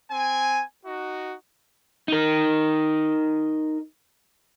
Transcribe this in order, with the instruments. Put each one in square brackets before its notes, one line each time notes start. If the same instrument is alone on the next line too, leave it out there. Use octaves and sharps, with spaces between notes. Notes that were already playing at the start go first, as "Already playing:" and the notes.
[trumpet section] C4 G#5
D#4 F#4
[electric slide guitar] D#4 A#4